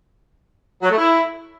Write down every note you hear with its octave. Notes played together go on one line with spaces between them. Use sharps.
F#3
A3
E4